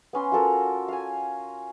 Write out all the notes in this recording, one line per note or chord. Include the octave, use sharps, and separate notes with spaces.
B3 C#4 C6
F4 F#4 A4 A#4
F5 G#5